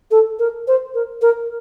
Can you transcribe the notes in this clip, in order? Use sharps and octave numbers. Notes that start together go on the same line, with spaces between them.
A4
A#4
C5
A#4
A#4